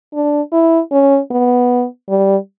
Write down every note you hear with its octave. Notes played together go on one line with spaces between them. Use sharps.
D4
E4
C#4
B3
G3